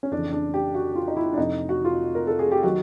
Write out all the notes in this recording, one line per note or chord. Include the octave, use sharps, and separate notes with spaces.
C#4
F2 C#3 E3 D4
D4
G4
F#4
F4
D#4
E4
D4
F2 C3 F3 D#4
F#4
F4
A#4
A4
G#4
G4
D#3 F#3 F#4